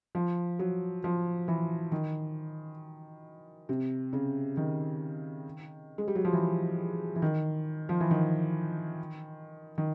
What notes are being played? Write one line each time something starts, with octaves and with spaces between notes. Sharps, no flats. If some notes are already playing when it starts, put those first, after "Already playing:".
F3
F#3
F3
E3
D#3
C3
C#3
D#3
G#3
G3
F#3
F3
E3
E3
D#3
F3
E3
D#3
D#3